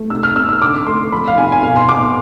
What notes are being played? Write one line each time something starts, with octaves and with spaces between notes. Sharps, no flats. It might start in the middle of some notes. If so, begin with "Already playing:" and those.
Already playing: A3
C3 E6
F6
C3 E6
E6
D3 D6
A3 C6
F3 B5
F5
C3 G#5
G#5
B2 F5
C6
B2 D6